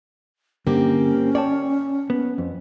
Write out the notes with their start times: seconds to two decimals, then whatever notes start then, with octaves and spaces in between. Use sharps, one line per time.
0.67 G2 D3 A#3 C4 C#4 G4
1.35 C#5 D5 G5 A5
2.10 B3
2.38 F2